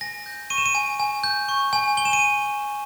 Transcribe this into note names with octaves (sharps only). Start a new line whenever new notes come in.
G#5 A#6
G6
C#6 D#7
E7
D#7
G#5
G#5
G6
C#6
G#5
G#5 G7
E7
D#7